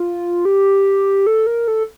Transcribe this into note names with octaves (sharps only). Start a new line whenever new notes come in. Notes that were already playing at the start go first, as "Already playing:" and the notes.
Already playing: F4
G4
A4
A#4
A4